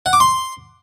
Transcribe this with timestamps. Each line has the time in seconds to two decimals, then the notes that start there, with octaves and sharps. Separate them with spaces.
0.06 F#5
0.13 D6
0.20 C6